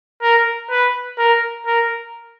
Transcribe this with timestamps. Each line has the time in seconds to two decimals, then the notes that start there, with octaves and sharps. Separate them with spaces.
0.23 A#4
0.71 B4
1.19 A#4
1.67 A#4